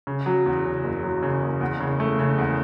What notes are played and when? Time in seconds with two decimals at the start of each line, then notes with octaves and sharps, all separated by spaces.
0.07 C#3
0.26 F#3
0.46 E2
0.65 C#3
0.84 F#1
1.03 F#3
1.23 C#3
1.42 F#1
1.61 E2
1.80 C#3
2.00 A3
2.19 C#3
2.38 E2